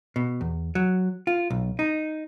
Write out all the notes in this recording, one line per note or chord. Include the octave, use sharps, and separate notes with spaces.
B2
E2
F#3
F4
B1
D#4